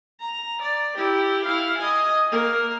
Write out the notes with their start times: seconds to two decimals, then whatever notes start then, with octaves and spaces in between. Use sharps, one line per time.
0.20 A#5
0.61 D5
0.97 E4 G4
1.45 E4 F5
1.78 D#5 G#5
2.31 A#3 A#4